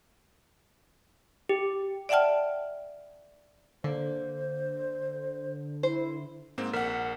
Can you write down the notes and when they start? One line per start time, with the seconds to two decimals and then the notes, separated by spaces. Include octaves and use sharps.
1.49 G4
2.09 D5 E5 F#5 G5 A5 F6
3.84 D3 A#3 C5
5.83 E4 C5
6.58 G#2 A#3 C4
6.73 A#1 A#4 F#5